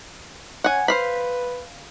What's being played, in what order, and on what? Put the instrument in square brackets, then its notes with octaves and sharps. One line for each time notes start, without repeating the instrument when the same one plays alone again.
[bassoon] C#4 [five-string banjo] F#5 G#5
[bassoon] B4 [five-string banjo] C5 F5 B5